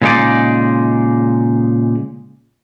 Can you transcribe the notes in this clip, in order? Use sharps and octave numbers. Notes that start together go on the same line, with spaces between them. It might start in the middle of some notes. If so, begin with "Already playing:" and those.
A#2 C#3 G#3 D#4 G#4 D5